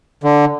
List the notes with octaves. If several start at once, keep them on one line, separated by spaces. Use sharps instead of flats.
D3